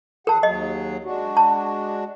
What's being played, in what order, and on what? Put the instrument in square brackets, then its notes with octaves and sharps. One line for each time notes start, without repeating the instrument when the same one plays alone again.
[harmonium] E2 G#4 F#5 [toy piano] A#4 A5
[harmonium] D#2 F#3 G#4 [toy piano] D#5
[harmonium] G#3 D4 F#4
[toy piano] A5